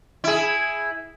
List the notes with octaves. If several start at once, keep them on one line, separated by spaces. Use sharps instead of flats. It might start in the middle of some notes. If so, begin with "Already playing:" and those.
E4 G#4